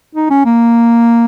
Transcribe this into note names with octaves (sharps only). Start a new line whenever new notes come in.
D#4
C#4
A#3